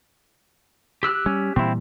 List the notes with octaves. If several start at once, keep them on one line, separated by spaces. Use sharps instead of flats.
G4 E6 F#6
G3 C#4
A#2 E3 G3 C4 E4